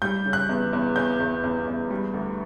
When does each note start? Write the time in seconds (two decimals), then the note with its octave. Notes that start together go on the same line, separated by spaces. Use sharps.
0.02 G3 G6
0.26 C#3
0.33 F#6
0.49 E2
0.73 E2
0.96 E2 G6
1.20 E2
1.43 E2
1.67 E2
1.90 G3
2.14 D2